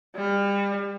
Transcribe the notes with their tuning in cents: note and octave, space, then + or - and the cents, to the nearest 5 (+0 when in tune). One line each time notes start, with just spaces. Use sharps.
G3 +35